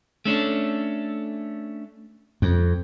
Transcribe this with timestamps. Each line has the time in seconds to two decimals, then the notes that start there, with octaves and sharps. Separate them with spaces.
0.26 A3 C#4 D4
2.42 F2